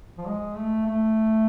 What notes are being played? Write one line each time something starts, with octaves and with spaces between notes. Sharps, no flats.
F3
G#3
A3
A3